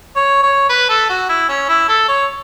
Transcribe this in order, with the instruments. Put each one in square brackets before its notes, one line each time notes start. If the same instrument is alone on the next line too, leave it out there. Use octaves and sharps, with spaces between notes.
[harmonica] C#5
C#5
B4
A4
F#4
E4
C#4
E4
A4
C#5